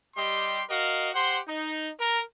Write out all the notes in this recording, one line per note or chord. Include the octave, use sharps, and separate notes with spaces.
G3 G4 D#5 C6
F#4 A#4 D#5 F5
G4 C5 F#5 C6
D#4
A#4